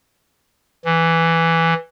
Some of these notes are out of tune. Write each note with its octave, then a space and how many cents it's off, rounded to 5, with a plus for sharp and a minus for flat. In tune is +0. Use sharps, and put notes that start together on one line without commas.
E3 +5